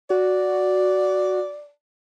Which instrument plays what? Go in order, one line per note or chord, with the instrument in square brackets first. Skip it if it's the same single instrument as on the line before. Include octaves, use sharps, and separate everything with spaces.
[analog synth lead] F#4 [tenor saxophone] D5